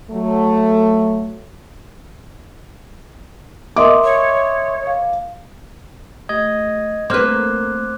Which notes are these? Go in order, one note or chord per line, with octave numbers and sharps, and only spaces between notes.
F#3 A3
A#4 D#5 E5 C6 D6 D#6
C#5
F5
A3 G4 D#5 G#6 A#6
A3 A#3 C4 B4 C5 D6 F6 F#6